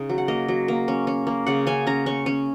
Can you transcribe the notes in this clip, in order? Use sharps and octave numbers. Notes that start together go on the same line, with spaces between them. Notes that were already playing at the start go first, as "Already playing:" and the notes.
Already playing: C#3 D#4
F#3
F#5
A#3 D#5
F#3
A#3
C#4
C#4
A#3
C#3 F#5
C#4 G#5
C#4 A#5
C#4 C#6
C#4